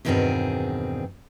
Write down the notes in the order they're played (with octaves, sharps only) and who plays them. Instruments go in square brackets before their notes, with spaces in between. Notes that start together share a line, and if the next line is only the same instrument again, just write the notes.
[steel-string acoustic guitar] E2 G2 B2 D#3 C4 G#4